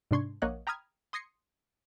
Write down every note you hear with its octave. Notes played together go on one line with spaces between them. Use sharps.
G#2 C3 D4 C6 C#6 G#6
A#1 A#3 C#5 D#5 F#5 F#6
G5 A#5 B5 D#6 F6 G#6
C6 D#6 G#6 A#6 C7 C#7